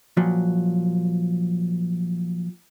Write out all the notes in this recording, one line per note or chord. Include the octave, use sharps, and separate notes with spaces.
A#2 F3 F#3